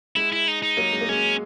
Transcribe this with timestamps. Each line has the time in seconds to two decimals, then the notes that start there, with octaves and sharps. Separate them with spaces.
0.16 G#3 E4
0.32 E4
0.48 D#4
0.62 D#4
0.77 F#3 A#3
0.93 G#3
1.01 A#3
1.09 G#3 C#4